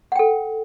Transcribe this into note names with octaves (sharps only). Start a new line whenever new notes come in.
A4 F#5 G5